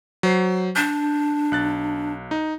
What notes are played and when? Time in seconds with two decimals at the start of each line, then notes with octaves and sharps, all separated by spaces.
0.23 F#3 C5 C7
0.76 D4 G6 A6
1.52 B1 F#6 A6
2.31 D#4